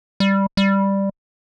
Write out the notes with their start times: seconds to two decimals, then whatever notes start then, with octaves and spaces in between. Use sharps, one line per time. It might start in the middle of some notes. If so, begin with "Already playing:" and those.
0.20 G3
0.57 G3